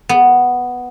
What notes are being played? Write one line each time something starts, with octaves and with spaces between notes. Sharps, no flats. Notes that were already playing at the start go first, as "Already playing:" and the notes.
B3